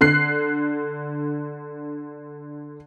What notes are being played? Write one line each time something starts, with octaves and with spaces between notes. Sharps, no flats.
D3 F#6 C7